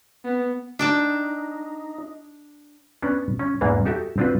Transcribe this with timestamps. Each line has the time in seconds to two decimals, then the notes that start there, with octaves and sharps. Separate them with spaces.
0.25 B3
0.79 D4 D#4 G5 A5
3.02 B3 C#4 D4
3.39 C#4
3.61 E2 G#2 E3 A#3 D4
3.85 D#4 F#4 G4 A4 E5
4.18 C4 D4 F4 F#4 B4